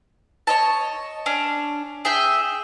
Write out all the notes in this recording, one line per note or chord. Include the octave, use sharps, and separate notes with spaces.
C#5 D#5 A5
C#4 D4
G#4 E5 G5